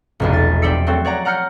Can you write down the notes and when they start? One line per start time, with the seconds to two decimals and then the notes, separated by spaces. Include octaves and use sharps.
0.20 F1 B1 E2
0.33 A6
0.62 C4 G4 D5 E6 C#7
0.87 F#3 A3 C4 A4
1.05 C#5 D5 F#5 A#5
1.25 F#5 A#5 F6 G6 C#7